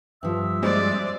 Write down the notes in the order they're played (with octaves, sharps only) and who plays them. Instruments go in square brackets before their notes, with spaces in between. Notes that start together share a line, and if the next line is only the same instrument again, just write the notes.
[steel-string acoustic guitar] G2 F3 [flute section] E5 D#6 E6
[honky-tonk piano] G#3 C5 [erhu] D5